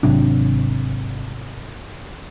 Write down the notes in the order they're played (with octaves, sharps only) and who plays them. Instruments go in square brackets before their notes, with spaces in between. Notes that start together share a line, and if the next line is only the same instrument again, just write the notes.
[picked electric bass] G#1 C3 F#3 D4